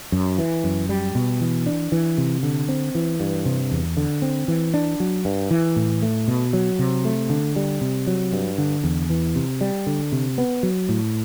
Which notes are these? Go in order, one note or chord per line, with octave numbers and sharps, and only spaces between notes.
F#2
E3
F#2
G3
B2
E3
D4
E3
C3
D3
C4
E3
G2
C3
E2
D3
C4
E3
D4
F#3
G2
E3
A2
A3
B2
F#3
C3
A3
D3
G3
C3
F#3
G2
D3
E2
E3
C3
G3
D3
C3
B3
F#3
A2